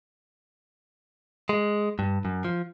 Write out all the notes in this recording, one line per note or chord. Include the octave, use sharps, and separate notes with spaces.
G#3
G2
F#2
F3